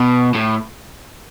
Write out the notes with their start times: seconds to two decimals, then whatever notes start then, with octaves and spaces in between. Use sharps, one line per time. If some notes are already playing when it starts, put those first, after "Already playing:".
Already playing: B2
0.35 A2